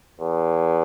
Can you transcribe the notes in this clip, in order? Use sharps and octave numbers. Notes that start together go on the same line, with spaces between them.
E2